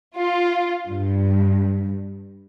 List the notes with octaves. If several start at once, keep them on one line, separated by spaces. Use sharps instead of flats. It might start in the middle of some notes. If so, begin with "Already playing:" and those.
F4
G2